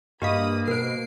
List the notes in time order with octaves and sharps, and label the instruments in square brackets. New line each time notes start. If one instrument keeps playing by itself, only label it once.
[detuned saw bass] G2 [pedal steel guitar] A#3 [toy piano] G4 D#5 F5 [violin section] B5 D#6
[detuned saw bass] B2 [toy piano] A#4 C5 [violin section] C7 D7